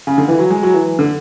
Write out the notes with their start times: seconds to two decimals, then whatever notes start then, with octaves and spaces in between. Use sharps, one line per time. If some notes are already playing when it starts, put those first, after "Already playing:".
0.07 C#3
0.18 D3
0.28 E3
0.39 F#3
0.50 G#3
0.63 F#3
0.74 E3
0.99 D3